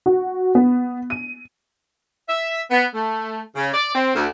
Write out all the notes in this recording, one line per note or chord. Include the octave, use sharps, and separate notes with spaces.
F#4
B3
D#7
E5
B3
A3
C#3
D5
C4
D2